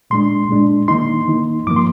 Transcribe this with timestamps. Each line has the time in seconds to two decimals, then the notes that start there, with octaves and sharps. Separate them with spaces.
0.10 A#2 G#3 D4 C6
0.49 A#2 G#3 D4
0.88 D#3 A#3 D#4 C6
1.28 D#3 A#3 D#4
1.67 G2 F3 A#3 D6
1.76 C6